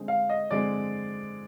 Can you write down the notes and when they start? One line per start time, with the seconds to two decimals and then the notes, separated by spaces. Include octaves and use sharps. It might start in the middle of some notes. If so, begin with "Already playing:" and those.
Already playing: D3 G#3 C4
0.08 F5
0.30 D#5
0.51 D3 G#3 C4 D5